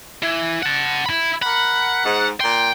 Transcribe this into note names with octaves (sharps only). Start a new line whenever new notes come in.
E3
F#5 A5
E4 B5
A#4 F#5 B5
G#2
A#2 G5 C6